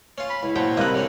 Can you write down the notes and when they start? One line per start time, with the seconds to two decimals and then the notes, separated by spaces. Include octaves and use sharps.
0.18 C#4 F4
0.29 B5
0.43 C#2 E4
0.55 A#2 F#3 C5 F#5 G5 A5
0.77 C3 G3 A#3 C4 D#5 B5 F#6
0.94 D3 F#3 C#4